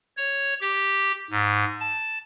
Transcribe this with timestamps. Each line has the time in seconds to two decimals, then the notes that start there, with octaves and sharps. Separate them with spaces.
0.17 C#5
0.61 G4
1.31 G#2
1.80 A5